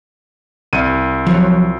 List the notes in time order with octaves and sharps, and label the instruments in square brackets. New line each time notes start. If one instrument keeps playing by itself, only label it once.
[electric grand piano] C2 D#7
[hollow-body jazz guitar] F3 F#3